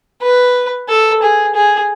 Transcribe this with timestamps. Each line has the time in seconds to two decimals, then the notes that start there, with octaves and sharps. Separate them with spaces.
0.22 B4
0.88 A4
1.22 G#4
1.55 G#4